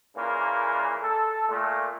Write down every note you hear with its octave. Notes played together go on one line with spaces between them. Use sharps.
A#2 C#3 E3 A#3
A4
A#2 A3